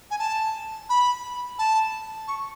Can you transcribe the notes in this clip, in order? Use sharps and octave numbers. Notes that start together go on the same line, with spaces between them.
G#5
A5
B5
A5
C#6